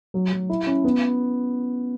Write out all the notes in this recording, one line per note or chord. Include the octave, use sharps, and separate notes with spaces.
F#3
F#3
E4
C#4
B3